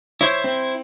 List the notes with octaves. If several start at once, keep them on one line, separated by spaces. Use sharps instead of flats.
E4 C5 C#5
C4